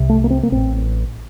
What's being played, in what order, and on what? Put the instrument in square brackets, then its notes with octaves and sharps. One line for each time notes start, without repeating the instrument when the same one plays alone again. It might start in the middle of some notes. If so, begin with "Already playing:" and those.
Already playing: [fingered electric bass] C2 C3
A3
A#3
C4
A#3
A1 A2 C4